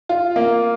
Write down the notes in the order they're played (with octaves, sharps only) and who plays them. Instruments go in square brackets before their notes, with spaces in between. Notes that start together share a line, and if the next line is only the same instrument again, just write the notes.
[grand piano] F4
A#3